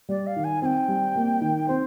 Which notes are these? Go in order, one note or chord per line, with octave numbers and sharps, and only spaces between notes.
G3 D5
F5
D#3
G#5
C4 G5 G#5
G3
A#3
D#3
C4 C5